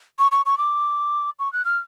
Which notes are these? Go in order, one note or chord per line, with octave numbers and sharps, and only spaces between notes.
C#6
C#6
C#6
D6
C#6
F#6
F6